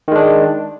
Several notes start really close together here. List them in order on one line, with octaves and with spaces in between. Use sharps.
D#3 G#3 D4